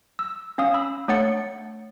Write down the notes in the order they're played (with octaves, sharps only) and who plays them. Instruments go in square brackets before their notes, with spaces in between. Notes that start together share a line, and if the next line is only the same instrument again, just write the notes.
[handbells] E6
C#4 F5 D#6
B5 E6
A3 D4 C#5 F#5 A6 C#7